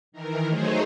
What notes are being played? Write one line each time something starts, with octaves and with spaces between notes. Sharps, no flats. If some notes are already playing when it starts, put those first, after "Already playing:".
D#3 E3 A#4
F#3 A3 D#4 G#4 C5 C#5